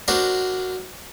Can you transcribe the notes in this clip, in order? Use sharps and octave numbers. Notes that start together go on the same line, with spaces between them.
D4 F#4 A#4 C5 D5